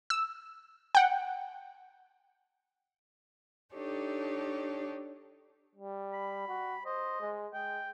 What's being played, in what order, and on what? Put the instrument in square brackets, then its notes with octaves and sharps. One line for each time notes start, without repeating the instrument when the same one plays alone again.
[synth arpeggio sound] E6
F#5 G5
[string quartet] D4 D#4 G4 A4 C#5
[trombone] G3
[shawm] B5
[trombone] F#4
[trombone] C5 [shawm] D#5
[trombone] G#3
[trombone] G#3 [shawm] G5